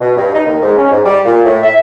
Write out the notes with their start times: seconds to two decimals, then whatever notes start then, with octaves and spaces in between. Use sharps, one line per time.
0.01 B2
0.17 G2
0.34 D#4
0.46 D#2
0.62 G#2
0.77 C#4
0.90 G#2
1.05 G3
1.25 A#2
1.45 A2
1.63 E5